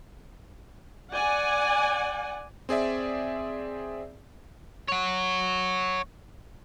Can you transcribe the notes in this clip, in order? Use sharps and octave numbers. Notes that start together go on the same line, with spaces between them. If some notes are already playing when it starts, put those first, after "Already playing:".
D5 F#5 G#5
C4 G#4 D5 E5
C#5 F#5